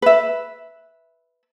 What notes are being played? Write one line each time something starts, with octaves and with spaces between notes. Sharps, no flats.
B4 E5